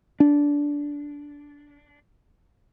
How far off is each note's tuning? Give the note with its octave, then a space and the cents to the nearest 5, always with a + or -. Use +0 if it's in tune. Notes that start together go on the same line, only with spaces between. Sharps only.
D4 -15